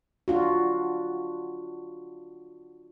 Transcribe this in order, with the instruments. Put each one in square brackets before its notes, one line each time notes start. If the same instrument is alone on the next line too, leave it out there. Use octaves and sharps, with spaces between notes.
[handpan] D4 F4 F#4